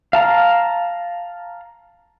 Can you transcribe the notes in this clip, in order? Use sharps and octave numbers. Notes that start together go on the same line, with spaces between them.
F5 A5 A#5